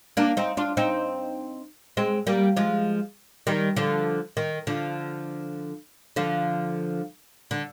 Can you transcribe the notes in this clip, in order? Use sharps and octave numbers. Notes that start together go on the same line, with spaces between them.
A#3 D4
C4 D#4
D4 F4
C4 D#4
G#3 C4
G3 A#3
F3 G#3
D#3 G3
D3 F3
D#3
D3 F3
D3 F3
D3